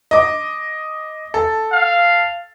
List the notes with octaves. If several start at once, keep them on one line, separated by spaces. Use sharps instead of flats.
D#5 D6
A4
F5